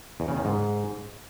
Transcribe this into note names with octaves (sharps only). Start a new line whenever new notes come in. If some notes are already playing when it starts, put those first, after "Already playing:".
E2
C#3
D#3
G#2